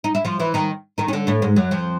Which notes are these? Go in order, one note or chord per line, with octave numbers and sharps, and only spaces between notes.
D#4
E4
F3 F4
E3 E4
D#3 D#4
D#3 D#4
C#4
D3 D4
A2 A3
G#2 G#3
F#2 F#3
F2 F3